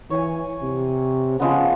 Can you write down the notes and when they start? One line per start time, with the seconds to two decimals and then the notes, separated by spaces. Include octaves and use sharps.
0.10 E3 C#5 G#5
0.62 C3
1.40 C#3 F3 G#3 B3